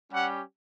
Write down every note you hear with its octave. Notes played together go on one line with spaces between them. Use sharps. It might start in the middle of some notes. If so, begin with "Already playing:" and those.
G3 C#4 G4 F#5